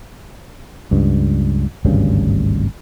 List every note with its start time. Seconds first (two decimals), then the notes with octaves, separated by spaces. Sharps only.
0.91 C#2 G2
1.85 G#1 D2 G2 C#3